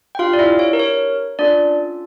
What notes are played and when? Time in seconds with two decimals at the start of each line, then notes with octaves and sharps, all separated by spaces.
0.15 G5
0.19 D4 F4 G4 F5
0.33 D5
0.39 E4 E5
0.59 C#5
0.73 A#4
0.79 C#5
1.39 C#4 D4 F4 A4 D5